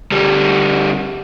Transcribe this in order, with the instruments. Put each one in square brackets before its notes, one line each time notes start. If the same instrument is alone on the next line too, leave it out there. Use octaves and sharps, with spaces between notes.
[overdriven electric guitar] D2 G3